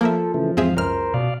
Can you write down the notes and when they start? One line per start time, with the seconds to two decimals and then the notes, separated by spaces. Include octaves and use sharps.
0.01 F3 A#3 A4 A#4 E5
0.34 C#3 E3 A3
0.57 E2 G#2 C4 G#4 E5 F5
0.77 C#2 F#2 A#4 C5 F6
1.14 B2 D5 F5